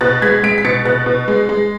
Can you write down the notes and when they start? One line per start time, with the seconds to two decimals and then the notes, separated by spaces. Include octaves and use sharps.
0.01 B2 F#6 A6
0.22 G#3 G#6 B6
0.43 G#3 B6 D7
0.58 B6
0.65 B2 A6 C#7
0.85 B2 F#6 A6
1.06 B2
1.28 G#3
1.49 G#3